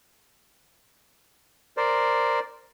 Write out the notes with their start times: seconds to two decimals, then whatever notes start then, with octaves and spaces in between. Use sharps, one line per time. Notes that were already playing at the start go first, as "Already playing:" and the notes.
1.77 A#4 C5 D5